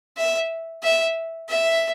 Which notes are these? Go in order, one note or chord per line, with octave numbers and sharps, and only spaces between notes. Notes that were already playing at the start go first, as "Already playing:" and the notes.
E5
E5
E5